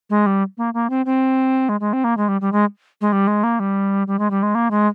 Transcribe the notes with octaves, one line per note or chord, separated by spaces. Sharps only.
G#3
G3
A#3
A#3
C4
C4
G#3
G#3
C4
A#3
G#3
G3
G3
G#3
G#3
G3
G#3
A#3
G3
G3
G#3
G3
G#3
A#3
G#3